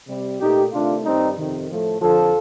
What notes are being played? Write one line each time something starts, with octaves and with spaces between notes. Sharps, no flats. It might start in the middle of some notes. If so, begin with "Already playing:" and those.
C3 G3
A#2 A3 D#4 G4
C3 D#3 A3 D4 F4
G2 D#3 G3 C4 D#4
F2 C3 D#3
A2 F3 A3
F2 D3 F3 F4 A4